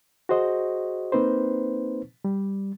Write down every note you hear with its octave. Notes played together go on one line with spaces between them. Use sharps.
F#4 G#4 C5 D#5
A#3 C4 D#4 B4 C5
G3